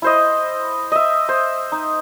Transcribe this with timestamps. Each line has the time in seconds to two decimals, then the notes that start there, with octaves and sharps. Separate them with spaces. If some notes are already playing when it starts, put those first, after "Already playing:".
0.02 E4 C5 D#5
0.92 D#5 E5
1.29 C5
1.72 D#4